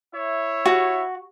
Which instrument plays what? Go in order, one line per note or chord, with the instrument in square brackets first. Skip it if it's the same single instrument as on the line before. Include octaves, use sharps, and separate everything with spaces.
[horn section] E4 C#5 E5
[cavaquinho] F#4